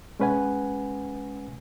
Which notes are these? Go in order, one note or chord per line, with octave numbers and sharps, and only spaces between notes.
G#3 C#4 B4 F#5 G#5